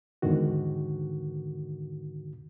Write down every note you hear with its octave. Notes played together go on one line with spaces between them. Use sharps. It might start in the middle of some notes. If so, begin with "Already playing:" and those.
E2 G#2 D3 D#3 F#4